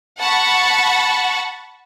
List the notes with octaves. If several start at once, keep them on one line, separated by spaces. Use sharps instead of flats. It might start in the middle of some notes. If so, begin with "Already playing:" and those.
F#5 A5 B5 C#6